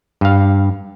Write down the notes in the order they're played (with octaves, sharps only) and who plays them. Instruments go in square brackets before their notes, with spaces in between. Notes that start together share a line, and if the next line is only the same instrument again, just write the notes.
[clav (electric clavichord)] G2 F5